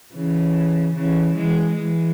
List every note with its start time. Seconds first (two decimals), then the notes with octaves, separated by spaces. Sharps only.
0.14 C#3 E3
0.95 C#3 E3
1.35 E3 G#3
1.75 E3 G#3